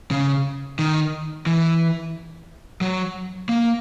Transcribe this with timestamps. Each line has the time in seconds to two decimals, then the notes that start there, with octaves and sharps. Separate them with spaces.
0.11 C#3
0.79 D#3
1.46 E3
2.81 F#3
3.49 A#3